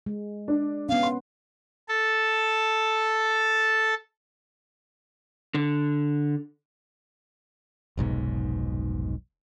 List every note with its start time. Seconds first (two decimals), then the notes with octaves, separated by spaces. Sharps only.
0.06 G#3
0.48 D4
0.89 B3 C#4 F5
1.03 C6
1.89 A4 A5
5.54 D3
7.97 F1 B1 G#2 B2